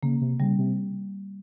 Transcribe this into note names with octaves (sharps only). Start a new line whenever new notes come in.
C#3 A#3
C3
C#3 G3
C3